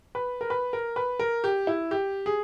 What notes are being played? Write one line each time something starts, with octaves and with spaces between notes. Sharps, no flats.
B4
A#4
B4
A#4
B4
A#4
G4
E4
G4
G#4